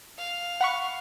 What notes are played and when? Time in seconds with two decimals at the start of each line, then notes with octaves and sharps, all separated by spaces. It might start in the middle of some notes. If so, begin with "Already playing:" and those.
0.18 F5
0.61 F#5 B5 C#6